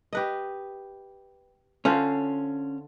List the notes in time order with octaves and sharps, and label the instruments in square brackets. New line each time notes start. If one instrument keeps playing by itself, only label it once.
[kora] G4 B4 D#5
[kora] D3 F4 C5 [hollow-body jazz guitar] C#4